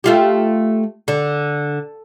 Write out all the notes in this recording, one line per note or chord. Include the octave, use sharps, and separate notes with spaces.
A3 F4 G4
D3